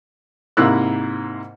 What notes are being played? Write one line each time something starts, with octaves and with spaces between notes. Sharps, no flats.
G#2 C3 A#3 E4 E6 F#6